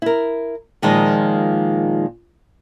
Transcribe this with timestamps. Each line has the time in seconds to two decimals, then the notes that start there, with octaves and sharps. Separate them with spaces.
0.02 E4 A#4
0.82 A#2 D#3 F3 G#3